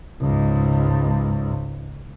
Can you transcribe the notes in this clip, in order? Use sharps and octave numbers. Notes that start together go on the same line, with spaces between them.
C#2 G#2